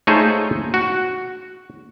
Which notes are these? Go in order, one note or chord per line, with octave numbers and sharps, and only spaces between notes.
A3 D#4 F4 G#4 C5 C#5
F#4